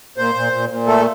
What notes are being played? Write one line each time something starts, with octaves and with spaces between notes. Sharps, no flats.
A#2 C5
A#2
A#2
A#2
A3 A4